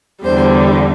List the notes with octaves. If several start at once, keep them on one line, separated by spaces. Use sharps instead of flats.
E2 D3 G3 C5